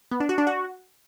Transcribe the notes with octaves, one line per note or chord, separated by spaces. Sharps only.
B3
D4
F#4
D4
F#4